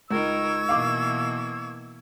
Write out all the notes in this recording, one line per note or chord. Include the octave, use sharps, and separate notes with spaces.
C#2 D#4 A#4 C#6 E6 G#6
B2 E3 A#3 F5 D6